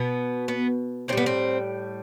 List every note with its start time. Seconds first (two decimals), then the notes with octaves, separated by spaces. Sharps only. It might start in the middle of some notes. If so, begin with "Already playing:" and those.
Already playing: B2 B3
0.48 B3
1.08 A2 E3 C4
1.13 G3 B3
1.26 C4